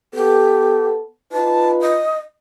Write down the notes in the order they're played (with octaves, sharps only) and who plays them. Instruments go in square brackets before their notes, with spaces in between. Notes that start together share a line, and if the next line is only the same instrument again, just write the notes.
[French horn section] B3 A4 [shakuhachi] G4
[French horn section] D#4 F4 B4 [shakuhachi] A5
[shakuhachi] D#5